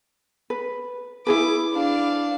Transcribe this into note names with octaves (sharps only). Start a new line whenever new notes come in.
B4
E4 G#4 B4 D6
D4 F5